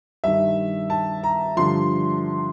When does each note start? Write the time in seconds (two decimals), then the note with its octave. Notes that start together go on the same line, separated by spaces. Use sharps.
0.24 G2 D#3 E5
0.90 A5
1.23 A#5
1.57 G2 D3 F3 C6